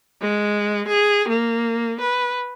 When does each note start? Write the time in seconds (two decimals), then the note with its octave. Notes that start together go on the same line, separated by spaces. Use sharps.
0.21 G#3
0.88 G#4
1.28 A#3
2.01 B4